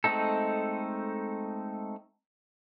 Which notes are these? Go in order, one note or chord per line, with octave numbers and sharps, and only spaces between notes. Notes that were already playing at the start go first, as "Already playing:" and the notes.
G#3 A3 C4 D#4 A4